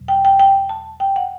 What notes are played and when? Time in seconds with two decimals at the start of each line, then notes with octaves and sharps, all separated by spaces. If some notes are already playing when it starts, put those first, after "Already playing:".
Already playing: E2 B2 F#3
0.08 G5
0.25 G5
0.40 G5
0.69 A5
1.00 G5
1.16 F#5